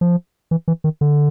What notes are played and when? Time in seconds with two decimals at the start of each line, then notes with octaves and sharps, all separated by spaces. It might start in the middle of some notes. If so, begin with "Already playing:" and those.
0.01 F3
0.51 E3
0.68 E3
0.84 D#3
1.01 D3